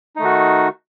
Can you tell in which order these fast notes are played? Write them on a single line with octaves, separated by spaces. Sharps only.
D#4 A3 D#3 F#4